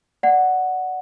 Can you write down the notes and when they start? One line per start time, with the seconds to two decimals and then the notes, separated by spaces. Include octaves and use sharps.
0.23 D5 F#5